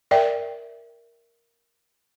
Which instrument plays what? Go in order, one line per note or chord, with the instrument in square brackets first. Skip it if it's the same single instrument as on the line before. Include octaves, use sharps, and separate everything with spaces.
[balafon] A#4 D5 E5 G5